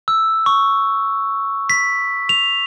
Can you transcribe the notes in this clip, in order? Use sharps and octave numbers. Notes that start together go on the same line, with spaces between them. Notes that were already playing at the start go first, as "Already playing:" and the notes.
E6
C#6
B6
F7